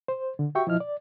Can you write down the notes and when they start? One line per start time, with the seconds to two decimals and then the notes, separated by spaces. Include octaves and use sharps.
0.08 C5
0.39 D3
0.55 F#4 G4 E5 G5 C#6
0.67 F3 E4 D#5 F6
0.80 D5